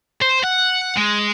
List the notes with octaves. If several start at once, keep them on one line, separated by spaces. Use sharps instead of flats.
C5
F#5
G#3